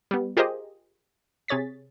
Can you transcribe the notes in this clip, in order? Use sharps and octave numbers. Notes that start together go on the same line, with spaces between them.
G3 B3
F4 G4 G#4 A#4 C5 D#5
C3 G#4 C#5 A6 B6